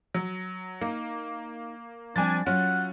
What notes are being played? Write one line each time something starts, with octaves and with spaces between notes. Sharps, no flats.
F#3
A#3 D#4
F3 G3 C4 D4 G#5 A6
F#3 C#4 F4 F#5